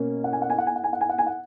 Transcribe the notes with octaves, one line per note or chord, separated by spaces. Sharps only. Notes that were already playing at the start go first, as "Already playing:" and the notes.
Already playing: B2 A#3 C#4
F#5
G#5
F#5
G#5
F#5
G#5
F#5
G#5
F#5
G#5
F#5
G#5
F#5